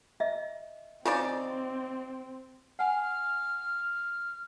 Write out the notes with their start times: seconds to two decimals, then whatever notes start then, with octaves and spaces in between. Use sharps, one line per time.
0.20 D#5 E5
1.05 C#3 C4 D#4 F4 D5
2.79 F#5 G#5 F6